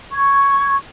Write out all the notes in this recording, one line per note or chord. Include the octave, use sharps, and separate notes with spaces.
C#6 G#6